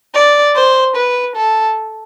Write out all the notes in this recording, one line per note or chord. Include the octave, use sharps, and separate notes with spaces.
D5
C5
B4
A4